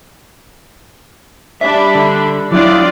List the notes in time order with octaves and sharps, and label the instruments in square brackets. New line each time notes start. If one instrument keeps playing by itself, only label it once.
[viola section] G3 D4 B5 [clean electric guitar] E5
[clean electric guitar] D3
[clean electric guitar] F#3 D4 [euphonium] E4 [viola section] F4 D5